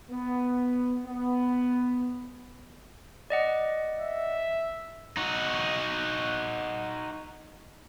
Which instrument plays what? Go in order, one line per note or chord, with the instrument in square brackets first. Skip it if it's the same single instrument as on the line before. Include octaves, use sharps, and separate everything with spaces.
[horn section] B3
B3
[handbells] D5 D#5 F#5
[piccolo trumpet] E5
[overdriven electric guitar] D#4 F#4